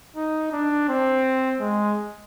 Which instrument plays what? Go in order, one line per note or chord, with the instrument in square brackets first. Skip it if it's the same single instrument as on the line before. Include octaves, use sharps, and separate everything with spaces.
[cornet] D#4
D4
C4
G#3